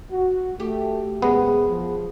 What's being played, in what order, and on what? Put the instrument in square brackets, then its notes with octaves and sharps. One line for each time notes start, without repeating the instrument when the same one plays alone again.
[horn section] F#4
[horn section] A3 [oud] G4
[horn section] F#2 C3 [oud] G#3 [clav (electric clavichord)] B3
[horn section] F3